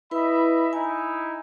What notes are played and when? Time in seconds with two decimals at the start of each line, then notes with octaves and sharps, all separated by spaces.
0.11 E4 B4 D#5 E5 B5
0.73 D#4 E4 G#5